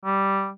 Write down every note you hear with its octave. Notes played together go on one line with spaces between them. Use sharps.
G3